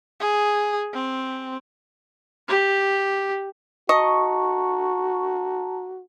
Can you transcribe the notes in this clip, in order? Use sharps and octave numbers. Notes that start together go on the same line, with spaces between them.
G#4
C4
G4
F#4 D#5 A5 A#5 C#6